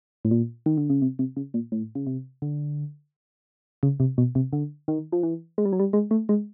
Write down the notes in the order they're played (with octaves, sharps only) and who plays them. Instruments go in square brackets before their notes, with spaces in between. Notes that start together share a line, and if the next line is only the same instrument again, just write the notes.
[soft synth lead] A2
A#2
D#3
D3
C#3
C3
C3
C#3
A#2
A2
C#3
C3
D3
C#3
C3
B2
C3
D3
D#3
F3
E3
G#3
G3
F#3
G3
G#3
A3
G#3